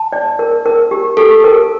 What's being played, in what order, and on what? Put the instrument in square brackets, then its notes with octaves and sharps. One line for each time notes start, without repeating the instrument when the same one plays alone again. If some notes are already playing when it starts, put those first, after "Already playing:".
Already playing: [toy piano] A5
D5
A#4
A#4
G4
[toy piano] G4 [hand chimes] A4
[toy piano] A#4